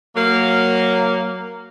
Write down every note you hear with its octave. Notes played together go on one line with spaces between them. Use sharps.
F#3 A#3